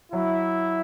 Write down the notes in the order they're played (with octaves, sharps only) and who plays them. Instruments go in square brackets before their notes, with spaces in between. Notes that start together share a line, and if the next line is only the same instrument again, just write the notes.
[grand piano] F#3 [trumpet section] E4